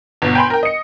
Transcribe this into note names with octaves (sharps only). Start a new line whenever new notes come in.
G1 B2
G5 G#5 B5 C6
A#4 G5
D#5 C#7